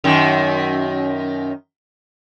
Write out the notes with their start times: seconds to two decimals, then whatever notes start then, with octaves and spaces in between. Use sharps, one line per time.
0.04 F#2 D#3